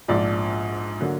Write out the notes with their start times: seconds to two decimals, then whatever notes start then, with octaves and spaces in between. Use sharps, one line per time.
0.08 A#1 G#2 F3 D5
1.01 D3 F#3 A#3